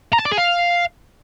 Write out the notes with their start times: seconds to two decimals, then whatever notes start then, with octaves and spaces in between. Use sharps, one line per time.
0.13 A#5
0.19 A5
0.26 D5
0.32 G#4
0.38 F5